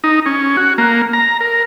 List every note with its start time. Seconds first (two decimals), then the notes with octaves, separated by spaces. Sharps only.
0.04 D#4
0.26 C#4
0.57 F#4
0.78 A#3
1.13 A#5
1.40 A#4